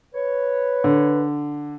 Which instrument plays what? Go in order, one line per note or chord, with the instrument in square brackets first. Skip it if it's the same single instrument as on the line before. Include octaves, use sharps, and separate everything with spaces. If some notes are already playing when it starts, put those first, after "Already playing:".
[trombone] B4 [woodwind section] C#5
[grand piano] D3